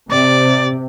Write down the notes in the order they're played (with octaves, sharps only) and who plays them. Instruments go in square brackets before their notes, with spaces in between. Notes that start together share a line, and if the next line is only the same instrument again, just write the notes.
[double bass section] C3 [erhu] D5